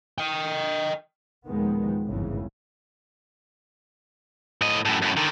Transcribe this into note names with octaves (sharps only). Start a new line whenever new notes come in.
D#5 G5
D#2 A#2 D#3 F3 G#3 B3
G#1 E2 G2 C#3 E3
A2 D#5
F#2 A2
F#2 A2
D3 D#3